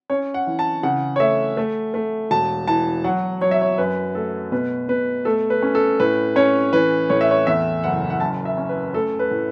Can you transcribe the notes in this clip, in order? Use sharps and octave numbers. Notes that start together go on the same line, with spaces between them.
C#4 C#5
F#5
E3
A5
C#3 F#5
C#5
A3 E5
A3
A3
E1 A5
E3 A5
F#3 F#5
F#3 C#5
E5
C#5
F#2 B4
A3 A4
B2 B4
B2 B4
A3 A4
B4
C#4
A4
A2 B4
C#4 C#5
E3 B4
A2 C#5
E5
C#5
E2 E5
F#1 F#5
F#5
F#2 A5
E5
C#4
B4
A3 A4
B4
A2